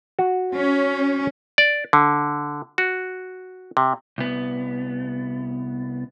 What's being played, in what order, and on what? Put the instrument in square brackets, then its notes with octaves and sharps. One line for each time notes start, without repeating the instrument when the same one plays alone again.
[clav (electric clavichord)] F#4
[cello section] C#4
[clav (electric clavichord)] D5
D3
F#4
C3
[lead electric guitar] C2 B3